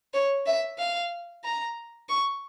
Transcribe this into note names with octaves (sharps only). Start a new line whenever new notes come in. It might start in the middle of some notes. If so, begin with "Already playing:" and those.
C#5
E5
F5
A#5
C#6